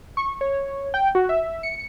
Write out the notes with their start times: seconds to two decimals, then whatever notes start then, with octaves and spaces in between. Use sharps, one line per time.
0.17 C#6
0.41 C#5
0.94 G5
1.15 F#4
1.29 E5
1.63 C#7